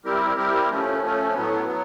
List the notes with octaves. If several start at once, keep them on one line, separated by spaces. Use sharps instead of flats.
G3 C4 E4 G4 A#4
G3 C4 E4 G4 A#4
F3 A3 C#4
F3 A3 C#4
A2 F#3 B3
F#3 B3